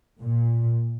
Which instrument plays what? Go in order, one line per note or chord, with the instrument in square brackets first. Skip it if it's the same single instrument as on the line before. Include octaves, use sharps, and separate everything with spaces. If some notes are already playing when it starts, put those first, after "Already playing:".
[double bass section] A#2